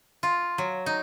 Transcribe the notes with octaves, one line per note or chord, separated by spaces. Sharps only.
F4
F#3
D#4